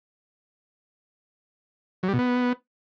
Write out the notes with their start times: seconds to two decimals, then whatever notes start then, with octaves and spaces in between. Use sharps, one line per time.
2.03 F#3
2.08 G3
2.14 B2
2.19 B3